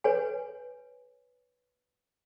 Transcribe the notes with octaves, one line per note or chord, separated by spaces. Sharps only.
B4 C#5 G#5